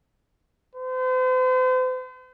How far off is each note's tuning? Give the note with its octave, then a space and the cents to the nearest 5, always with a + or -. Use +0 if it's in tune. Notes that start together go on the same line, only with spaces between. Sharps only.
C5 -40